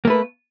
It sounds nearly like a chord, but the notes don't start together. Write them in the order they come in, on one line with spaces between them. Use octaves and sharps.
A#3 A3 B4